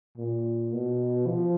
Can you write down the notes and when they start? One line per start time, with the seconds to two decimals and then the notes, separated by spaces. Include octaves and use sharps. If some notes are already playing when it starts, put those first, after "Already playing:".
0.18 A#2
0.73 B2
1.27 F3